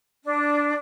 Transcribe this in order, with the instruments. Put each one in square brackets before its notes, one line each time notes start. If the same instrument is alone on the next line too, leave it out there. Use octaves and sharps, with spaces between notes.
[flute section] D4